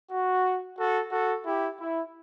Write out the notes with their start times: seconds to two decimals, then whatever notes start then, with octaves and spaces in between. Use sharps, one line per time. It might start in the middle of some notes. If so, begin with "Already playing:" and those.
0.11 F#4
0.79 F#4 A4
1.12 F#4 A4
1.46 E4 G4
1.79 E4